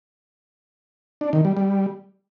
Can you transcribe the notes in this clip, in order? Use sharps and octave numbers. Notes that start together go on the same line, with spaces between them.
D4
D#3
G3
G3